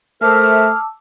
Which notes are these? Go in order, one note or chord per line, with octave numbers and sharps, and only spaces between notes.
A3 A#4 C5 E5 A5 D6 E6 F6